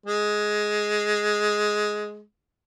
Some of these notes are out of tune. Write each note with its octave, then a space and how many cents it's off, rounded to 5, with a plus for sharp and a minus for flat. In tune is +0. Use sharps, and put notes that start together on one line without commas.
G#3 +10